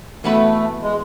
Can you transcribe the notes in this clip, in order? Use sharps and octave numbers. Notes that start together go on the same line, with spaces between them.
E3 A3 B3 F#4 B4
G#3